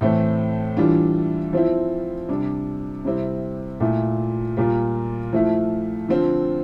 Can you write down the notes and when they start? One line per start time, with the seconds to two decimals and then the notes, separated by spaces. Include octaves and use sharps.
0.01 A2 E3 A3 C4
0.77 E3 G3 D4 F4
1.53 F3 C4 E4
2.29 C3 G3 D4
3.05 C3 G3 C4 E4
3.80 A#2 A3 E4
4.57 A#2 G3 A#3 F4
5.33 F3 A3 E4
6.09 D3 F3 C4 F4